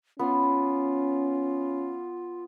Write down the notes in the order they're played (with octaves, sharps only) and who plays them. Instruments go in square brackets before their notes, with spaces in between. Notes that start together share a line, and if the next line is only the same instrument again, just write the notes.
[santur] B3 [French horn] C#4 [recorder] F4